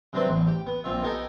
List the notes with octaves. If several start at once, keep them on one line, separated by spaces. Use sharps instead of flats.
C3 F#3 C4 D4 B4 C5
A1 E2
G4
B3
A#1 C4 F4 E5
B3 D#4 G4 A4 D#5 G#5